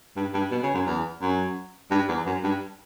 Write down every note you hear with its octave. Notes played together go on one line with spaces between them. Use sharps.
G2
G2
B2
C#3
F#2
E2
F#2
G2
E2
F#2
G2